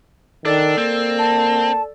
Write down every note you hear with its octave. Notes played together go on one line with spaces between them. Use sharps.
D#3 D4 A4 D5 A6
A#3 C4
A5